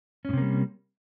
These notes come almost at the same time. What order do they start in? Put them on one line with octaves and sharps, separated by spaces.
C#4 A2 C3 A#3 G3